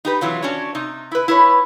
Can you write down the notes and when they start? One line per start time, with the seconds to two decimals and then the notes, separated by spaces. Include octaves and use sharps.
0.05 D#4 G4 B4
0.21 C3 E3 F#3 F4
0.42 C#4 D4 F#4 C#5
0.75 C3 D#4
1.12 E4 B4
1.28 E4 B4 C#5